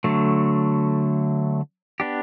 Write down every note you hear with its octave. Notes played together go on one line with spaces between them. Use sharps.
D3 F#3 A3
B3 D4 G4